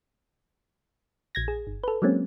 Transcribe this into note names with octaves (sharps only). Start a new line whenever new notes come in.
A#1 G#6 A#6
G#4
G1
A4 B4
F#3 G#3 A#3 C4 C#4